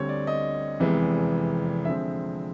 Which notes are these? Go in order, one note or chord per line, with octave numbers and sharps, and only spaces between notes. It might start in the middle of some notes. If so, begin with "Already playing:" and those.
Already playing: D2 D3 G3 C4 C#5
D5
D#5
F1 E2 C3 E3 G#3
D3 F3 G#3 C4 E5